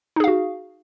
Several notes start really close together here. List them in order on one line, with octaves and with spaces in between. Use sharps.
D#4 G#4 F5 F#4